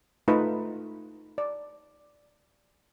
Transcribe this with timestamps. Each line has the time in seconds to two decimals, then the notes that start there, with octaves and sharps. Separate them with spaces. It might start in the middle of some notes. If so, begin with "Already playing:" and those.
0.28 A3 D#4 F4 B4
1.38 D5